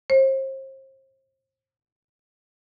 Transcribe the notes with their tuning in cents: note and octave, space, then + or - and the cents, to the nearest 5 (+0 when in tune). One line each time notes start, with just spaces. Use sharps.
C5 +35